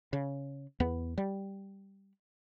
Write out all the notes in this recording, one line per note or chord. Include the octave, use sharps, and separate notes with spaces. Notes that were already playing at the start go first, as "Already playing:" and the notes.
C#3
E2 B3
G3